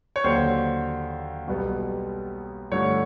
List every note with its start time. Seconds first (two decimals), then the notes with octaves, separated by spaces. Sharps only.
0.16 C#5
0.24 D#2 D3 F#3 C5
1.48 B1 B2 G3 B3
2.72 G2 D3 F3 A3 C#5